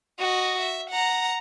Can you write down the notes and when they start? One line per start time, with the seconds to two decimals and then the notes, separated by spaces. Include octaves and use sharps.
0.19 F#4 D#5
0.59 E5
0.90 F#5 A#5